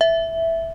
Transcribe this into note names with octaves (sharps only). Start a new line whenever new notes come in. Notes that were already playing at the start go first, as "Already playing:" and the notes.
E5